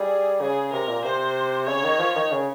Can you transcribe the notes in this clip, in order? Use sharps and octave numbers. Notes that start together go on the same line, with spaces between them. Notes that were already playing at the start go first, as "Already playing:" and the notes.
Already playing: G3 G#4
C#3 G#4
C3 A#4
A#2
C3 C5
C#3 C#5
D#3
F3
D#3
C#3